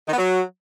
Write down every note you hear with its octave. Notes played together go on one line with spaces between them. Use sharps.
D#3
B3
F#3